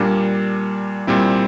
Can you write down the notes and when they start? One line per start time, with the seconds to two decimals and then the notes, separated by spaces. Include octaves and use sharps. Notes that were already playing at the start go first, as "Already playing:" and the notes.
Already playing: A#2 G3 A#3 D4
1.07 A#2 G3 C4 E4